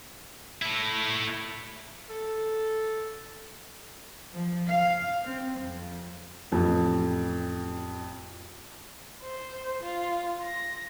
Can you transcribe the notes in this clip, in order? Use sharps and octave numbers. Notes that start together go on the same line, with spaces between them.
A3 E4
A4
F3
F5
C4
F2
A1 F2
C5
F4
A#6